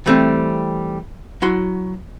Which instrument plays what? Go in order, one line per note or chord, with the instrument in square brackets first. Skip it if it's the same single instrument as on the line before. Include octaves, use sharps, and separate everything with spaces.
[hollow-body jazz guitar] E3 G3 A3 A#3 C4
F#3 E4 F#4 C6